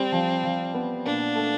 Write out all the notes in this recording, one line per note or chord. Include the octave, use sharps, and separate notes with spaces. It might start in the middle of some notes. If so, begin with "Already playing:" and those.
Already playing: G3 C4
F3
F3
B3
A#2 D4
A3